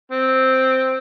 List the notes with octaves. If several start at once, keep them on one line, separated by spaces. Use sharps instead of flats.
C4